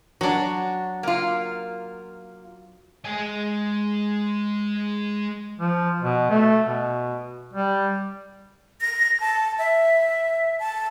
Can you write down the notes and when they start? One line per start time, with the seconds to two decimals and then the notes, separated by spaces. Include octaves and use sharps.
0.21 F#3 D4 F#4
1.03 A#3 F4
3.05 G#3 G#5
5.59 F3
6.02 B2
6.30 A3
6.65 B2
7.53 G3
8.81 A#6
9.20 A5
9.58 E5
10.59 A5